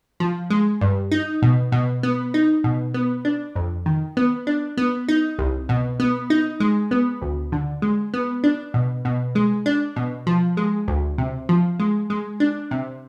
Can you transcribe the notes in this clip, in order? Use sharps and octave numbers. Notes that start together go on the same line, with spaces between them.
F3
G#3
G2
D#4
B2
B2
B3
D#4
B2
B3
D4
F2
D#3
B3
D4
B3
D#4
C2
B2
B3
D#4
G#3
B3
D2
D3
G#3
B3
D4
B2
B2
G#3
D4
B2
F3
G#3
D2
C3
F3
G#3
G#3
D4
C3